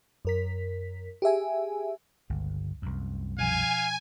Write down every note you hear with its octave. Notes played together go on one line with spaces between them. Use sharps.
F#2 A#4 B6
G4 G#4 E5 G#5
G1 C#2
C2 F#2
B2 F3 F5 G#5